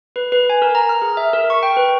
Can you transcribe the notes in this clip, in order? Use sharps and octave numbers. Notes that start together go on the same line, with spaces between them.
B4
B4
G#5
A#4
A#5
F6
G#4
E5
A#4
C#6
G5
B4